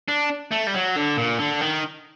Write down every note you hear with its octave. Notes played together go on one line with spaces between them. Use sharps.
D4
A3
G3
F#3
D3
A#2
D3
D#3